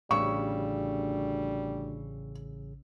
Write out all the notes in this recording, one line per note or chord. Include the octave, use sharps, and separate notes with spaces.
A1 D2 C#3 G3 C#6 E6